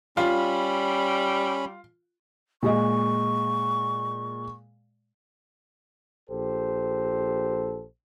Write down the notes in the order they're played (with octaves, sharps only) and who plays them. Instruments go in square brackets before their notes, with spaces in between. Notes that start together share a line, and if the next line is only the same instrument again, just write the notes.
[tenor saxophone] G3 [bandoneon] C#4 B5 [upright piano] F4
[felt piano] A#2 G#3 D#5 [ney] C#6
[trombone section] A#1 G4 A4 C5